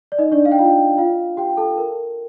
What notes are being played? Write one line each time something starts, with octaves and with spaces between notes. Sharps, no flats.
D5
D#4 D#5
D4 D5
F5
G5
F4 F5
F4 F5
G4 G5
A4 A5
A#4